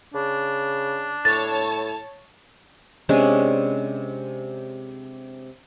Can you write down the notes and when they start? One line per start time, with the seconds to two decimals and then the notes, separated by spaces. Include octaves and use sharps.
0.14 C#3 D4
1.25 A2 C#5 A5 A6
3.09 C3 G#3 C#4 D4